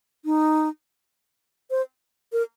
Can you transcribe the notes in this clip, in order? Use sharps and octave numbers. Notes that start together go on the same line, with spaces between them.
D#4
C5
A#4